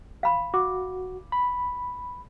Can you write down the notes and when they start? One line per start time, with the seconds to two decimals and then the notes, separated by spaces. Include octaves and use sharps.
0.23 F5 B5 C6
0.54 F#4 D6
1.32 B5